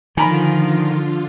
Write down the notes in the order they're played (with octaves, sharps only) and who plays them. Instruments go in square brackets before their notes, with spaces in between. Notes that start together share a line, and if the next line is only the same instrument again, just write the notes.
[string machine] D3 F4 [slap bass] D#3 [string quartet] F3 [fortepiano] G#5 A#5 B5